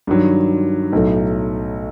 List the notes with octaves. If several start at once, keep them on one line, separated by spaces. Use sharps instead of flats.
G2 D#3 F#3
B1 A2 F#3 A3